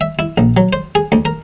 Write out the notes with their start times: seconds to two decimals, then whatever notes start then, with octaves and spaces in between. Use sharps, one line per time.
0.01 E5
0.19 E4
0.38 A#1
0.57 F#3
0.73 C5
0.95 G#4
1.12 D2
1.25 A#4